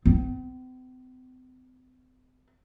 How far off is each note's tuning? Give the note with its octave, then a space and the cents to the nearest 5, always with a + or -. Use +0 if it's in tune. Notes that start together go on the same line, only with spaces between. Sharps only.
C4 -45